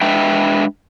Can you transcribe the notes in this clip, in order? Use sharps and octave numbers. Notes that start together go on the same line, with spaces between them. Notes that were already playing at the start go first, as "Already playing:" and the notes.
G#3 D4 B4 E5 G5